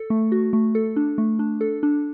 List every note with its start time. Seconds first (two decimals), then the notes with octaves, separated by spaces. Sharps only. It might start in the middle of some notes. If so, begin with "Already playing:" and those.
Already playing: A4
0.10 A3
0.32 F#4
0.53 A3
0.75 A4
0.96 D4
1.18 A3
1.39 D4
1.61 A4
1.83 D4